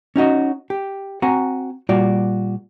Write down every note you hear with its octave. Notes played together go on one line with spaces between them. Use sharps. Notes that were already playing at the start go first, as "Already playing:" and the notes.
C#4 D#4 F#4 D#5
G4
C4 F#4 F#5 G#5 A#5
A#2 G3 F4 F#4 D5